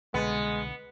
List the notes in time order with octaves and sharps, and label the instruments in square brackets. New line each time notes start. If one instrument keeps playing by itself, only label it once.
[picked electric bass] C2 B2 D3 [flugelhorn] G#3 [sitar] B3